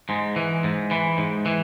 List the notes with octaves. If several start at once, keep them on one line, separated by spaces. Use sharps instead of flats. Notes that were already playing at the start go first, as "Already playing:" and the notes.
G#2 G#3
E3
G#2
E3
G#2
E3